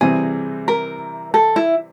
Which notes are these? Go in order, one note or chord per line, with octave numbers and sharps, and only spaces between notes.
C3 E3 G3 C4 G#4
A#4
A4
E4